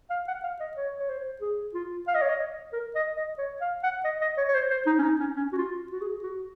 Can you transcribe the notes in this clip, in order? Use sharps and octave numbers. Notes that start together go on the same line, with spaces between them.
F5
F#5
F5
D#5
C#5
C#5
C5
G#4
F4
F5
D#5
C#5
D#5
A#4
D#5
D#5
C#5
F5
F#5
D#5
D#5
C#5
C#5
C5
C5
D#4
C#4
D#4
C#4
C#4
F#4
F4
F#4
G#4
F#4